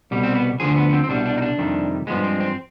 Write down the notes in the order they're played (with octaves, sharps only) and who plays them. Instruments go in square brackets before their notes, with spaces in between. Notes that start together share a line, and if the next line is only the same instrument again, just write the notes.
[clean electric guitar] C2 B2 G3
C4
B3
D2 D3 F3 G#4
B3
B3
C4
C4
C2 B2 G3 D4
D4
D#4
D4
F2 C3 D#3 G3
G2 F3 G#3 B3
C4
C4